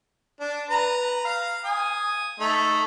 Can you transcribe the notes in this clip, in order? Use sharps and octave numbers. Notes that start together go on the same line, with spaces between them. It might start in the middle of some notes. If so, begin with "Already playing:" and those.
D4
B4 A#5
F5
G#5 D#6
A3 D#4